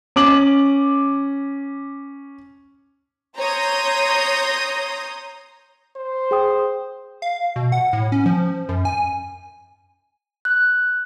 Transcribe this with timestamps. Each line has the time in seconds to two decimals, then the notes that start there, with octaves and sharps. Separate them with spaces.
0.16 C#4 D6 F#7
3.37 C#5 A#5 C6 D#6 G6 A#6
5.96 C5
6.31 G#4 G5 D#6
7.22 F5
7.56 B2
7.72 F#5
7.93 A2
8.12 C#4
8.26 F3
8.69 F#2
8.85 G#5
10.45 F#6